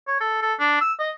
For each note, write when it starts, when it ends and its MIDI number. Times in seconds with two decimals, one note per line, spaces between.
0.07 0.16 73
0.20 0.40 69
0.42 0.53 69
0.59 0.77 62
0.81 0.93 88
0.99 1.11 75